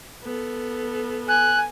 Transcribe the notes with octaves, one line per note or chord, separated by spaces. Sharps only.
B3 A4
G#5 F#6